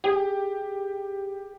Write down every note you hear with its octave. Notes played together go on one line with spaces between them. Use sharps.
G4 G#4